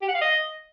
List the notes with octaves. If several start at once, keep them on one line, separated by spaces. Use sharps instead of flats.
G4
F#5
F5
D#5